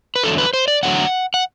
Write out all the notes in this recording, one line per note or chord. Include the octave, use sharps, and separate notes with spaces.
B4
E2 D3 F#3 A3 A4
B4
C5
D5
E2 D3 F#3 A3 F#5
F#5